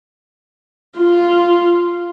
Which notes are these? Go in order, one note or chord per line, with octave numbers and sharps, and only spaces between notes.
F4